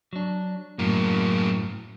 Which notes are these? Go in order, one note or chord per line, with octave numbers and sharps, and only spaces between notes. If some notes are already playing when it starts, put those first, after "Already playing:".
F#3 D4
F#2 A2 F#3 A#3